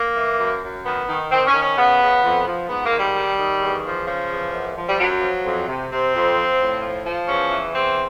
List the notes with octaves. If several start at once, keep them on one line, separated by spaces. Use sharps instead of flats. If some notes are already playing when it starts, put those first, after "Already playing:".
Already playing: A#3
E3
F#2
F#2
D#3 B3
D#3
D#3 C4
C#4
D#3
C#4
C#3 B3
C#3
F2
F3
G#2 B3
A#3
D#3
G3
D#3
D#3
E2
F3
C#3 F3
E2
F#2
F3
G3
F#2 F#3
F3
F2
C3
C3 C4
F2
F3
A2
F3
F3
E2 C#4
E3
E2 C4